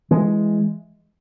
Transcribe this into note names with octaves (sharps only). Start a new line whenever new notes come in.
E3 G#3